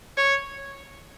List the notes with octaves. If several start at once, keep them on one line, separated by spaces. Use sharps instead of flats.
C#5